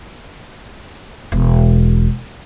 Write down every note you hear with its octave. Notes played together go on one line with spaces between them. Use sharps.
E1